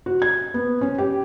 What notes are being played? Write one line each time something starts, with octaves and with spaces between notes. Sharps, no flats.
F#4
G#6
B3
C#4
G4